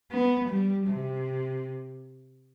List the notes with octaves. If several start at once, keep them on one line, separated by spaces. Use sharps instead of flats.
B3
G3
C3